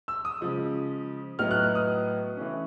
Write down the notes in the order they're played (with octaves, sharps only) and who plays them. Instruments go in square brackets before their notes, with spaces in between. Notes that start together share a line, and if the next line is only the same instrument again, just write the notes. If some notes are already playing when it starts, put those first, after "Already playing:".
[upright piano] E6
D#6
C#3 F3 G#3
A2 F#3 B3 D#4 F6
F#6
F6
D#6
E3 A3 C#4